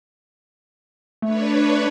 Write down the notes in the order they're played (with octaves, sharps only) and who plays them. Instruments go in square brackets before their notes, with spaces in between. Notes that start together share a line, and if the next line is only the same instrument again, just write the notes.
[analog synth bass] A3 [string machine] D4 B4 C#5